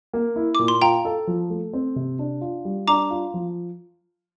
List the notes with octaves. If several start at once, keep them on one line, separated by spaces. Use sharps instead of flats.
A#3
E4
A#2 D6
C6
F4 G5 A#5
A4
F3
A3
C4
C3
D4
F4
G3
D4 A#5 D6
F4
F3